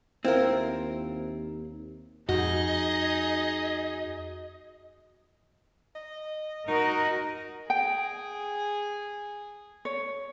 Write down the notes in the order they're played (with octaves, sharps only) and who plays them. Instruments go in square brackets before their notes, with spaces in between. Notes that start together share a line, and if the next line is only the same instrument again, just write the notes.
[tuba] D#2 [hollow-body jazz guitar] C4 [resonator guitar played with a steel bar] E4 F4 A#4
[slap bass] F2 [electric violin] D#4 G#4 [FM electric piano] F#4 [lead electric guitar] D#5
[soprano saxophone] D#5
[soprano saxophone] D#4 [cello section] F#4 A#4 D#5
[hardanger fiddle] G#4 [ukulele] G5
[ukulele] C#5